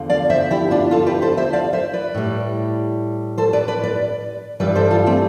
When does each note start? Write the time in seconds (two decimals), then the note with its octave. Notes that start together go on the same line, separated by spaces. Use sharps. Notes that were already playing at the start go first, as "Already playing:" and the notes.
Already playing: E2 D3 F3
0.10 D5 F5
0.30 C5 E5
0.51 E4 G4
0.71 D4 F4
0.91 F4 A4
1.06 G4 B4
1.22 A4 C5
1.37 C5 E5
1.53 D5 F5
1.73 C5 E5
1.93 B4 D5
2.15 A2 G3
3.38 A4 C5
3.53 B4 D5
3.68 B4 D5
3.83 B4 D5
4.60 G2 E3 G3 B4 D5
4.75 A4 C5
4.91 F4 A4
5.06 A3 C4